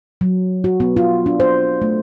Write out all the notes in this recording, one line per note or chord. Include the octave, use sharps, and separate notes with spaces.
F#3
F#4
B3
F4
D4
C5
A3